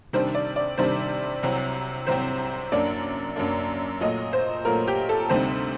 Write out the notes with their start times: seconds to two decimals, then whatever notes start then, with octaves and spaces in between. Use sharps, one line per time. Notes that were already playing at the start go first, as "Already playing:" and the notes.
0.13 C3 D#3 G3 D4 C5
0.35 D5
0.56 D5
0.78 C3 D#3 G3 D4 C5
1.43 C2 C3 F#3 C4
2.07 C2 C3 F#3 C4 C5
2.72 F#2 F#3 A#3 D4 D5
3.36 F#2 F#3 A#3 D4
4.00 A#2 F#3 A3 D#5
4.33 C5
4.65 A#2 F#3 A3 A#4
4.88 G4
5.09 A4
5.30 D2 C3 G3 C4 D#4 C5